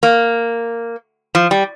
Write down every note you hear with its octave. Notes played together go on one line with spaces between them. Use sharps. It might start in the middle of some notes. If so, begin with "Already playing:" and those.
A#3
F3
G3